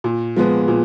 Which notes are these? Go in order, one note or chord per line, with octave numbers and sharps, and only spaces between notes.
A#2
F3 G#3 B3
A#2